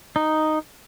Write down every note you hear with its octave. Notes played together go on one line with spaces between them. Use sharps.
D#4